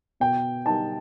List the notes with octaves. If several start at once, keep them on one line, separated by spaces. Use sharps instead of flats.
B2 G5
G3 D#4 A5